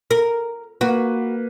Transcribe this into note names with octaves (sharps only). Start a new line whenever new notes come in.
A#4
A#3 F#4 B4